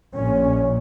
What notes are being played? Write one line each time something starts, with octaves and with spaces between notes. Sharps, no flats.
A#1 A#2 C#4